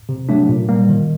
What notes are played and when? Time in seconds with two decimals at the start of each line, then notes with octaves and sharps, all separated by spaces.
0.09 C3
0.29 F#3 A3 D4
0.49 A#2
0.69 G3 A#3
0.89 D#3